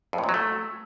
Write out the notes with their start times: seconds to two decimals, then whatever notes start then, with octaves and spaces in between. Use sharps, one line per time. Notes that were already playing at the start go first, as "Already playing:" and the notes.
0.13 F2
0.18 A2
0.24 A#2
0.29 F#3
0.34 A3